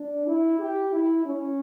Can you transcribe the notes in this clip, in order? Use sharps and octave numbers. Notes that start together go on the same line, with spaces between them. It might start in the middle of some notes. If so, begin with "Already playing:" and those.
Already playing: D4
E4
G4
E4
C#4